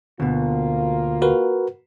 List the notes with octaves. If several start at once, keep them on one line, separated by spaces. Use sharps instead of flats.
D2 B2 A#3 F4
F#4 A#4 B4